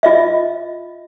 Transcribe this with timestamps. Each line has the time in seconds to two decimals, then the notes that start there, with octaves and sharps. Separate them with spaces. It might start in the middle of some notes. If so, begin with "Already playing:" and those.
0.03 F4 D#5 E5